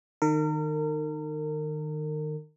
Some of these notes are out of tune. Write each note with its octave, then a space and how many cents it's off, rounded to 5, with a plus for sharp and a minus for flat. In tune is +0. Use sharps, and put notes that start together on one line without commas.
D#3 -20 A#4 -35